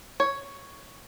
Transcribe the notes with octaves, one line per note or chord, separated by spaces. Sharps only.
C#5